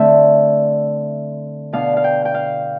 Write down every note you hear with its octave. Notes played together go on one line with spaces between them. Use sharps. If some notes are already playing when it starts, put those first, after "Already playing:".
Already playing: D3 A3 C4 E5
B2 B3 D4 F5
F5
G5
G5
F5